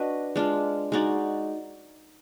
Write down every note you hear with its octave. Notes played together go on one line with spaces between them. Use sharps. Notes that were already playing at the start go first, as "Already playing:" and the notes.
Already playing: D4 F#4 B4 D#5
G#3 D4 F4
G#3 D#4 F#4 D5